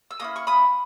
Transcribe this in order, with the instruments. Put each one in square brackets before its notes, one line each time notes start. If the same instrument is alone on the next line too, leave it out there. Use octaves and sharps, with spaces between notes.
[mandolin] E6
A#3 C#4 E4 D#6
C#6
B5 D#6